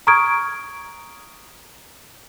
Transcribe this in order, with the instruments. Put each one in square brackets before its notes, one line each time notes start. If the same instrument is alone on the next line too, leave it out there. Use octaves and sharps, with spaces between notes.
[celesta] A#5 C#6 D#6 F6 G#6 D7